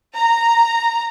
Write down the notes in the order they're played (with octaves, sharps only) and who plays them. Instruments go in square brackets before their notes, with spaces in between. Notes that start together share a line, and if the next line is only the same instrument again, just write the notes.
[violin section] A#5